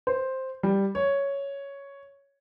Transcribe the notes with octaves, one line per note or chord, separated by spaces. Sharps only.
C5
G3
C#5